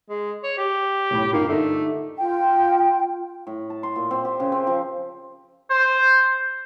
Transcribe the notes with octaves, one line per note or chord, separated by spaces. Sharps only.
G#3
C#5
G4
B1 A2 B5
G2 A#3 D#4 F4
D3 A3 D#4
F4 G5
A2
A5
C6
A#2
C4
G4
C#3
C4
F3
C5